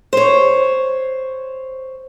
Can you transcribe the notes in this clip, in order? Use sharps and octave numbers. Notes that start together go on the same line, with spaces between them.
C5 C#5